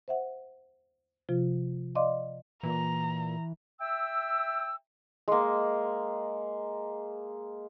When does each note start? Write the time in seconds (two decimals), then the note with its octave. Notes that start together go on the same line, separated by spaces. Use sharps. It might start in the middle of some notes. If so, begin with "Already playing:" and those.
0.08 C5 E5 F#5
1.29 C3 F3 F4
1.95 D5 D#5 F5 C6 D6
2.63 A#2 E3 A#5
3.79 E5 G5 E6
5.28 G#3 A#3